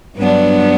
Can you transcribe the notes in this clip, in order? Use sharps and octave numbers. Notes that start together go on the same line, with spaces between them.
G2 F#3 B3 D4